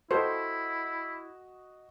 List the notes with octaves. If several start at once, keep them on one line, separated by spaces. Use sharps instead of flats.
E4 F#4 A4 C5 D#5